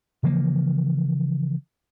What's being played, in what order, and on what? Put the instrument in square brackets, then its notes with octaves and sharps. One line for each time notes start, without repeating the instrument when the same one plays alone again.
[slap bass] C#3 E3 F3 A#3